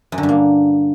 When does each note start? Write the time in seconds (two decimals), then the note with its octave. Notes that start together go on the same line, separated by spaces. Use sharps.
0.12 F#2
0.18 D3
0.23 G2
0.29 A#3